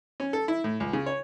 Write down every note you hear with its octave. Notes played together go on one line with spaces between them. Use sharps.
C#4
A4
E4
A2
C#2
C#3
C#5